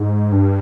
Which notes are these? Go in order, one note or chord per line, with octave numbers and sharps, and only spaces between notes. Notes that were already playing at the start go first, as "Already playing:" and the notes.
Already playing: G#2
G2